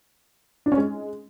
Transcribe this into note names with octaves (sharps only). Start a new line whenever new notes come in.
D4
C#4
G#3